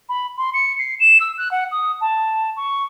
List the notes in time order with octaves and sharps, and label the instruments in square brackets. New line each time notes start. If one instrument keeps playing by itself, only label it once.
[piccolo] B5
C6
C#7
C7
E7
E6
F#6
F#5
D#6
A5
C#6